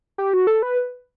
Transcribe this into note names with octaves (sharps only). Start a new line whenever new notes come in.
G4
F#4
A4
B4